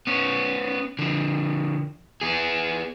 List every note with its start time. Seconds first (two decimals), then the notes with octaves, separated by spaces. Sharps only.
0.07 B3 C#4
0.99 D3 F3
2.21 B3 G#4